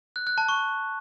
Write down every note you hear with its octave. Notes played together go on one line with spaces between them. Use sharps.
F#6
F#6
A5
C#6